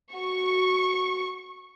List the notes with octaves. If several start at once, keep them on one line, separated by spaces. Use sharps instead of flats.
F#4 C#6